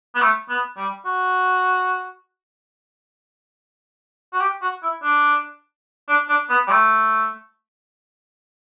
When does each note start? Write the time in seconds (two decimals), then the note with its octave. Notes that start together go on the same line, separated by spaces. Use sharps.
0.15 B3
0.21 A3
0.49 B3
0.77 G3
1.05 F#4
4.33 F#4
4.40 G4
4.62 F#4
4.83 E4
5.03 D4
6.08 D4
6.29 D4
6.49 B3
6.67 G3
6.71 A3